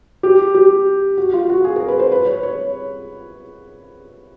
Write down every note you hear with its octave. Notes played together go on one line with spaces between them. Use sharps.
G4
G4
F#4
F4
F#4
G#4
A#4
B4
C5
B4
C#5
C#5